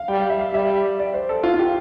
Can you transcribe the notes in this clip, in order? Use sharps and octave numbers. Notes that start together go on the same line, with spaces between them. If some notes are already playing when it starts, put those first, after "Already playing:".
Already playing: F5
G3 G5
F5
E5
F5
G3 E5
D5
C5
A4
F4
F4
G4